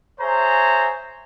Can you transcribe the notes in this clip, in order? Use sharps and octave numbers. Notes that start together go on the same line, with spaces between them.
G#4 C5 C#5 E5 A#5